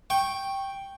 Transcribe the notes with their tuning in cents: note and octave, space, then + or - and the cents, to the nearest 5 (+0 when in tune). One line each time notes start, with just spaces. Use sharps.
G5 +0 C#6 -15